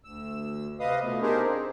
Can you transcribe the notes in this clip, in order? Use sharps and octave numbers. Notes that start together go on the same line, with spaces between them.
D2 E6
C3 B4 D#5 F5 D#6
B2 F3 A3 B3
D4 D#4 G4 G#4 A#4 C5
C4